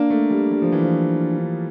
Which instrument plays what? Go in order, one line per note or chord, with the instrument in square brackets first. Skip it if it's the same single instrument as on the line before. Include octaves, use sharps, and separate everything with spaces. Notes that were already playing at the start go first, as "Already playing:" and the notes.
Already playing: [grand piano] A#3 [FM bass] D4
[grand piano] A3
G3
G3
F3
E3
F3